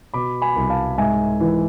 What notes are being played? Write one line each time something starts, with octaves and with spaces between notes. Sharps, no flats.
B2 B5 D6
G#5 B5
C2
F5 A5
G#2 E5 G#5
E3